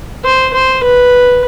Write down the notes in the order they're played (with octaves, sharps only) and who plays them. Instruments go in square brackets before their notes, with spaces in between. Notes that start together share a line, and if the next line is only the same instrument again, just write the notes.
[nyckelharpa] C5
C5
B4